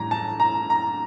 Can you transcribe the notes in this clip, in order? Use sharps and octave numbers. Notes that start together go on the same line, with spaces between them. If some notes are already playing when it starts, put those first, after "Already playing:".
Already playing: A2 E3 G3 A#5
A5
A#5
A#5